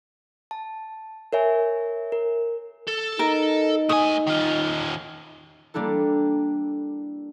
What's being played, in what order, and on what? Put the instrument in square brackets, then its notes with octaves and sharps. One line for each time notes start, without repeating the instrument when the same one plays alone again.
[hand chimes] A5
A#4 C#5 E5 G#5
A#4
[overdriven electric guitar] A4
[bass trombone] D#4 [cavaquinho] A#4
[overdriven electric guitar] A2 G#5 [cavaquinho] D#6
[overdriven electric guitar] D#3 F4
[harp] G3 A#3 D4 E4 A4